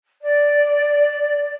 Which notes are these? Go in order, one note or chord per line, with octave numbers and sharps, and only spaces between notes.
D5